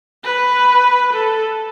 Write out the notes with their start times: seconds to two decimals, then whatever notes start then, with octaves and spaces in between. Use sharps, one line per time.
0.24 B4
1.14 A4